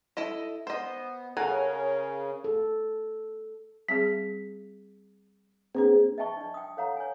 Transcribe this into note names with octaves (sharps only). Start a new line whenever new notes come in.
E4 A4 D#5
B3 C5 D#5
C#3 C#4 A4 A#4 F#5 G#5 A#5
A4
G3 C4 G#4 B6
A#3 C4 D4 G#4 B4
D#5 E5 G5 A5 C#6
D4 D5
G5 D#6
A4 C#5 F5 F#5 A#5
C#5 G#5